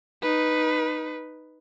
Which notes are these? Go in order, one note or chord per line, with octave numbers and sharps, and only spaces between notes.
D#4 B4